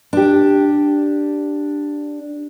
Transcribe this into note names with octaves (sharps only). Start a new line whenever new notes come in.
D4 G4